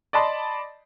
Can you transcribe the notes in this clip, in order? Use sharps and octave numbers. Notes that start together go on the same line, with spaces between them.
D5 D#5 A5 B5 C6